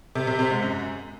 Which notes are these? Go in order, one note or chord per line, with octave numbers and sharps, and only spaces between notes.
C3
C3
C3
G#2
F#2